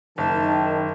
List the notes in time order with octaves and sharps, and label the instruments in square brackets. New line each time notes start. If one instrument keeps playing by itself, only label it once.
[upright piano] F#1 [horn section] D#3 [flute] A5